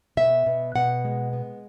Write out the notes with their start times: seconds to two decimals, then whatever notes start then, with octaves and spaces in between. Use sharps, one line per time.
0.17 B2 E5
0.46 B2
0.76 B2 F#5
1.05 G#3
1.33 B3